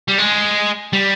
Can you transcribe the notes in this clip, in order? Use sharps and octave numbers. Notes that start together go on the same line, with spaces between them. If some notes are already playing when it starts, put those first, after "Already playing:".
G3
G#3
G3